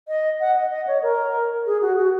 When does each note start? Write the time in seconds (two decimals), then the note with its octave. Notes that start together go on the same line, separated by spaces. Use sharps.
0.08 D#5
0.40 F#5
0.56 D#5
0.71 D#5
0.87 C#5
1.02 A#4
1.66 G#4
1.82 F#4
1.97 F#4